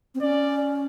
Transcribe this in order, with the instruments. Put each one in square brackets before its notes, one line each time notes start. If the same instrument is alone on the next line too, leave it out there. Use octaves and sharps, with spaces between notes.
[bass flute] C4
[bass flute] C#4 [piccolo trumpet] D5